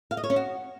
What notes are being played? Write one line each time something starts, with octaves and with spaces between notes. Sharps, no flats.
F5
D#5
C#5
C#4
F#4